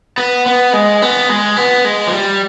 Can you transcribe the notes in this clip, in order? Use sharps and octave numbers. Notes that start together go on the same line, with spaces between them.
B3
B3
G#3
B3
G#3
B3
G#3
F3
G3